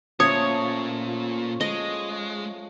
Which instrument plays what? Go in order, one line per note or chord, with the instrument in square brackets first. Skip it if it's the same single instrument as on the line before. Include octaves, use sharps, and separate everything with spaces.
[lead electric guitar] A#2 [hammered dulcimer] F3 A3 C#4 [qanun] C#5 [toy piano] D#6
[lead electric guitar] G#3 [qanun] D#5